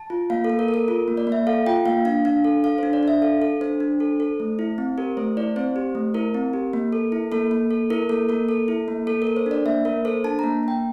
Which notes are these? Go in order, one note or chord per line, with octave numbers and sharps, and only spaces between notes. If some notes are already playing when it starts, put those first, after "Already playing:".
Already playing: A5
F4
A#3 F5
A4
A#3
A#4
A4
A#4
F4 A#4
A#3
D5
A#3
E5
A4 F5
F4 G5
A#3 F5
D4 F5
D4 F5
A4
A4 F5
D4 C5
D5
D4 E5
A4 F5
A4
D4 C5
D4
A4
A4
A3
E4
C4
G4 A#4
A3 C5
E4 D5
C4 C5
G4
A3
E4 A#4
C4
G4
A#3
A4
E4
A#3 A4
A#3
A4
E4 A#4
A#3 A4
A#3 A#4
A4
E4
A#3
A#3 A4
A#4
A4
C5
D4 D5
A#3 E5
A#3 A#4
A4 C5
D4 A5
A#3 A#5
A#3 G5